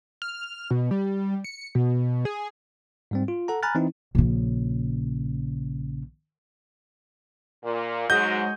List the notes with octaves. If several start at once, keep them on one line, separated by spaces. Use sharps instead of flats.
F6
B2
G3
C#7
B2
G#4
G#2 G3 C4
F4
A4 F#5 A#5
G#5 A#5 B5 F6 F#6 A6
E3 C4 D#4 E4
A#1 C#3
A#2
G#2 F#3 G#3 F#4 D#5 G6